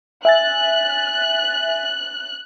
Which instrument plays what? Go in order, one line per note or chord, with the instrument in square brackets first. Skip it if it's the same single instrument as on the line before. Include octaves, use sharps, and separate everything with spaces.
[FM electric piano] E5 G#5 A6 [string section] F#6